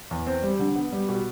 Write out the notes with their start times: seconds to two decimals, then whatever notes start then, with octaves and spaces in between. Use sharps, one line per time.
0.11 E2
0.27 C4
0.43 G3
0.59 D3
0.76 B3
0.92 G3
1.09 B2